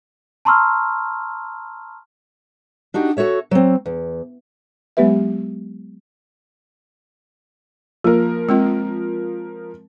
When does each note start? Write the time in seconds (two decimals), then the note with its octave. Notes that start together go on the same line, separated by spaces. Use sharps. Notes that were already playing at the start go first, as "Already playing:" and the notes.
0.45 A5 A#5 C6 C#6 E6 F6
2.94 D4 D#4 F#4 G4
3.17 F#4 A4 C#5 E5
3.51 F#3 C4
3.86 E2
4.97 F#3 G#3 B3 G4 B4 E5
8.04 F3 A#3 A#4
8.49 G#3 C4 F4